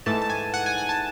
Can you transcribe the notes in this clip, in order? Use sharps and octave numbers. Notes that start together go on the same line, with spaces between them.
G#2 E3 A3 A5
A5
G#5
F#5
G#5
G#5
A5